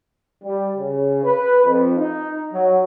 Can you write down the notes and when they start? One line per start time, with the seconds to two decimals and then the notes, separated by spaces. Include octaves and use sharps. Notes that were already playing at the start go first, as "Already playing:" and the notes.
0.44 G3
0.77 C#3
1.24 B4
1.65 F2
1.97 D#4
2.52 F#3